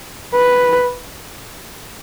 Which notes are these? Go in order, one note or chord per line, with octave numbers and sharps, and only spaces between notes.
B4